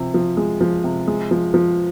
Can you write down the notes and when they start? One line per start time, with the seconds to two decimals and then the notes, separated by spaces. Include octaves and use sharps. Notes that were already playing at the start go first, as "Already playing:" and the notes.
Already playing: C3 F3
0.14 F3
0.37 G#3
0.61 F3
0.84 C3
1.07 G#3
1.31 F3
1.54 F3